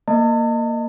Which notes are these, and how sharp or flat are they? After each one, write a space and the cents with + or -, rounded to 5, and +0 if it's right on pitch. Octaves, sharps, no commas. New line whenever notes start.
A#3 -5 D#5 -20 A5 +45